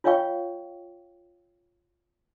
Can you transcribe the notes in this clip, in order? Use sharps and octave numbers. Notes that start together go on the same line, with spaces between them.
F4 C#5 D#5 F5 G5 C#6